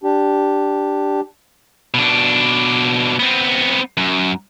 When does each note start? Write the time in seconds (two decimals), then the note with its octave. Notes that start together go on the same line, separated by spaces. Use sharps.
0.03 D4 G4
1.94 B2 D4
3.19 B3 C4
3.97 F#2